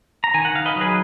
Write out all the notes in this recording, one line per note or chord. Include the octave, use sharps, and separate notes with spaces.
A#5
D#3 G#5
F#5
D#3 F5
B4 D#5
F#3
G#4 B4